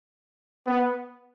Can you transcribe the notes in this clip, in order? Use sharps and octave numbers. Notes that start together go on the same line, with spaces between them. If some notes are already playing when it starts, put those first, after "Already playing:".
B3